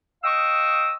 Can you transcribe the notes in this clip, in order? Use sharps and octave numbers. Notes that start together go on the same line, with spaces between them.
D#5 F5 G5 C#6 D#6 E6